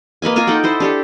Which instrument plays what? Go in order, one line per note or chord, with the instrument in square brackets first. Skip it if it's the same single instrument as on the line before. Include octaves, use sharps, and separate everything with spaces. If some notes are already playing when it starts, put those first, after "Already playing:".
[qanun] A#3 B4 D#5 G#5
F4 A#4 G#5 A#5
D#4 A4 F#5 G5
E4 C5 D#5
D4 G4 A4